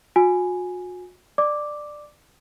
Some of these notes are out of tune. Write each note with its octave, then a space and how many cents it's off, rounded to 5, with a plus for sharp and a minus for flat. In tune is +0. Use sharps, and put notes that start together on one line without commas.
F#4 -40 G#5 +0
D5 +15 D6 +0